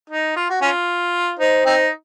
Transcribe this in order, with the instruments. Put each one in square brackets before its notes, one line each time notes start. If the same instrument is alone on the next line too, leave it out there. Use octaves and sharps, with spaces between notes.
[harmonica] D#4
F4
F#4
C#4 F4
[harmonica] D#4 [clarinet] C5
[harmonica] C4 D#4